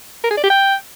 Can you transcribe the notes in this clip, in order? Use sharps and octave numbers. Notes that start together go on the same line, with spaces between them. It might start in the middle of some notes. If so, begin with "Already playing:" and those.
A#4
G#4
D5
G4
G5